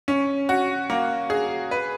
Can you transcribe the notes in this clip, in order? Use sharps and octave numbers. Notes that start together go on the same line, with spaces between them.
C#4
F#4
A#3
G#4
B4